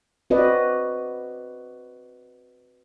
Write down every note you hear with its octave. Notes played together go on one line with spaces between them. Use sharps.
C4 F#4 B4 D5 D#5